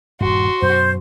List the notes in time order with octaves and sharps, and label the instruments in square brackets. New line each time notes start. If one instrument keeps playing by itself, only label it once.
[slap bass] D#1 G2 [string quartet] F#4 C6
[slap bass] F#2 B2 F#3 [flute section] C5